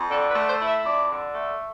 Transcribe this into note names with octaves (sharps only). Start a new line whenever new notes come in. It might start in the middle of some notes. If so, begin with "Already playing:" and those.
Already playing: F2
D3 A4
B4
A3
C5
E4
E5
F2 D5
D3
A3